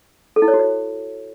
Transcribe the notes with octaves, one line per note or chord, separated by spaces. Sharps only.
A4
E4
C#5
F#4
C#5